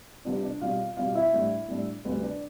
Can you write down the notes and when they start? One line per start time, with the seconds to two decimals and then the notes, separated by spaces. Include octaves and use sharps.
0.25 C3 G3 B3 D4 F4 D5
0.43 D4 D5
0.61 B2 G3 C4 F4 F5
0.97 B2 G3 C4 F4 F5
1.15 E4 E5
1.33 A2 G3 D4
1.68 A2 G3 D4
2.05 D2 C3 G3 B4
2.22 D4 D5